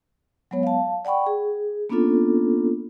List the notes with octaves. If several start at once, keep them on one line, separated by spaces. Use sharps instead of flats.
F#3 G#3 B3 C#5
F5 A5
D5 F#5 G5 B5 C#6
G#4
A#3 B3 C#4 D4 F4 A4